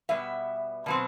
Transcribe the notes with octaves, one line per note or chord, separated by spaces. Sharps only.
B2 G3 B3 E5
B2 F#3 C4